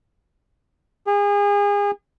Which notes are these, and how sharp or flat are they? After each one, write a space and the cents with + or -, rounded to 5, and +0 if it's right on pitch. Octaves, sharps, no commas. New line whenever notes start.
G#4 -35